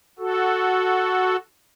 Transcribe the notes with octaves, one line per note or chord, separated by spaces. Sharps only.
F#4 A4